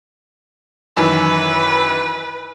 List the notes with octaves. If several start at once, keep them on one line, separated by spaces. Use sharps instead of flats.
F#2 D#3 E3 B4